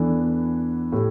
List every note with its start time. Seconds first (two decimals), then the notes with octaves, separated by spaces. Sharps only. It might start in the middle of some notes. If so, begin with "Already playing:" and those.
Already playing: E2 E3 B3 D4 A4
0.92 A2 A3 G4